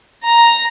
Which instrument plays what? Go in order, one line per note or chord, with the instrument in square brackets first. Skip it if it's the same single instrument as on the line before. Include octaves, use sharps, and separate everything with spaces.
[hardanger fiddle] A#5